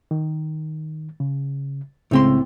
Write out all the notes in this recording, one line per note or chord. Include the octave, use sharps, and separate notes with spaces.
D#3
C#3
C2 A2 C#3 G#3 C4 C6